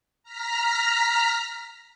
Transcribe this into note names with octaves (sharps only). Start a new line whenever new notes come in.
A#5 F6 B6